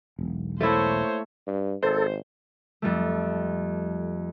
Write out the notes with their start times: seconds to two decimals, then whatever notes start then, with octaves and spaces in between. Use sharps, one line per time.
0.19 E1 B1
0.61 A3 A#3 E4 C5 C#5
1.47 G2
1.83 G#1 A4 C5
2.82 F2 G3 A3